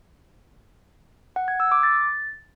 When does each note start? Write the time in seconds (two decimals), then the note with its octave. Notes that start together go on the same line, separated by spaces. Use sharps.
1.36 F#5
1.48 G#6
1.60 E6
1.72 D6
1.83 A6